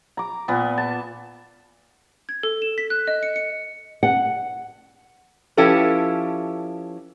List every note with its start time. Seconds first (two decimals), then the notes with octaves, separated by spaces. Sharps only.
0.17 A#5 D6
0.48 A#2 B3
0.78 A5
2.29 G#6
2.43 A4
2.62 E7
2.78 B6
2.90 F#6
3.08 D#5
3.23 C#7
3.36 C#7
4.03 F#5
5.57 F3 C#4 E4 G4 A4 B4